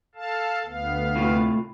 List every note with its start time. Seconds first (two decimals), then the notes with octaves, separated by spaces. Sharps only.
0.15 A4 F5 A5
0.66 D2 B3 F5
1.16 A2 C3 F4